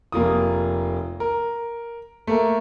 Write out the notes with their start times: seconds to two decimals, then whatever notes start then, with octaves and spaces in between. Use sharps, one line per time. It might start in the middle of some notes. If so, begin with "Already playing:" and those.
0.12 F1 A#3 F4 D#6
1.20 A#4
2.27 A3 A#3 A#4